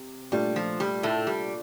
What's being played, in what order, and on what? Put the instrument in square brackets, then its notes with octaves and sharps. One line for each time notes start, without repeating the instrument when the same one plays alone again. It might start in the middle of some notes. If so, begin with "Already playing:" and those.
Already playing: [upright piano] C3
[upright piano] A#2 A3 D4 [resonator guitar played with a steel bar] G3
[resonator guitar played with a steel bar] F3
G3
A2 A3
G3